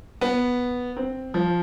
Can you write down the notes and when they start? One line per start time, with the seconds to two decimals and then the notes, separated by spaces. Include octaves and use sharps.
0.21 B3
0.96 C4
1.34 F3